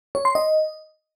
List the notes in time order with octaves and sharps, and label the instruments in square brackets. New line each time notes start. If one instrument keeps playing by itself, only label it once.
[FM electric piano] C#5
C6
D#5